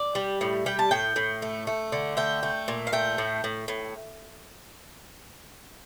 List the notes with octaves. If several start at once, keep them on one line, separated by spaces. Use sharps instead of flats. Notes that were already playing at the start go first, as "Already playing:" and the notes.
Already playing: D5
G3
A2
G3 G5
A5
A2 G5
A2
A3
A3
D3
A3 G5
A3
A#2
F5
A3 G5
A2
A2
A2